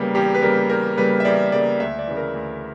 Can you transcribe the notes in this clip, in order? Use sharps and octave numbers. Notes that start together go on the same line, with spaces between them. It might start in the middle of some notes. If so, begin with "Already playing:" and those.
Already playing: E2 C#3 G3 A#3 B4
E2 G4
B4
C#3 G3 A#3 A#4
E2 A#4
C#3 G3 A#3 B4
E5
E2 D5
C#3 G3 A#3 D5
D2 E5
D5
C#3 E3
A#4
D2